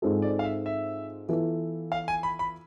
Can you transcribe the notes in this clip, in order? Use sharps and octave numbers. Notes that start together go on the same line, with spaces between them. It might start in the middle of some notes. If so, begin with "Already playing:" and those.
G#2 G#3 C4 F4 A4
D5
F5
E5
E5
E3 B3 F4 A4
F5
G#5
B5
B5